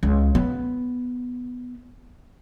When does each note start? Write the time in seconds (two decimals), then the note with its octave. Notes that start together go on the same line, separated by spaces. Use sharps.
0.03 C#2
0.35 B3